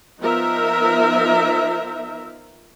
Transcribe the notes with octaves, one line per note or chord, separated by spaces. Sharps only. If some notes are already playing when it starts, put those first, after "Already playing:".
F3 B3 D#4 A#4 E5